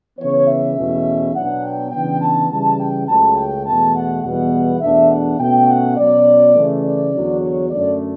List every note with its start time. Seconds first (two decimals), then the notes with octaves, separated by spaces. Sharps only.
0.19 C#3 E3 B3 C#5
0.48 E5
0.76 E2 B2 A3 C#4 E4
1.34 B2 F#3 B3 D4 F#5
1.64 G5
1.92 C#3 E3 B3 D4 G5
2.21 A5
2.50 C#3 E3 G3 A5
2.78 G5
3.08 C#2 C#3 F#3 A3 A5
3.37 G5
3.65 E2 B2 A3 A5
3.95 F#5
4.23 E2 B2 G3 B3 E4 F#5
4.81 E2 B2 A3 D4 E5
5.10 F#5
5.39 B2 A3 C#4 G5
5.68 F#5
5.97 B2 F#3 C#4 D5
6.55 C#3 E3 A3
6.84 D5
7.12 E2 D3 F#3
7.41 C#5
7.70 F#2 D3 A3 D5